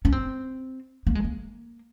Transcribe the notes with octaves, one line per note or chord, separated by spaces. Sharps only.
C#4
C4
A#3
G#3
A#3